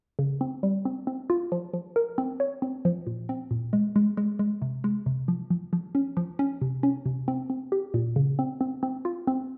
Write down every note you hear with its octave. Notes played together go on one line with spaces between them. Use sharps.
C#3
C4
G3
C4
C4
F4
F3
F3
A#4
C4
C#5
C4
F3
A#2
C4
A#2
G#3
G#3
G#3
G#3
C3
G#3
C3
F3
F3
F3
C#4
F3
C#4
C3
C#4
C3
C4
C4
G4
A#2
C#3
C4
C4
C4
F4
C4